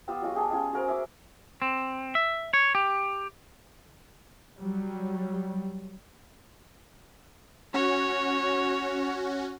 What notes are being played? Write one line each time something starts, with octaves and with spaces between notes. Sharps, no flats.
B3 F4 G4 E6
F#3 G#3 F4 F#4
G4 G#4 G5 A5
G#3 C#4 F4 G#4
F#4 G#4 A#4 C5
E5 D6
C4
E5
C#5
G4
F#3 G3
C#4 F#4 C#5